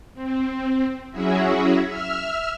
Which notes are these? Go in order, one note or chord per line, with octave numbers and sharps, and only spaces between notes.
C4
F#3 C#4 E4 F#4 G#4 E5
E5 E6 F6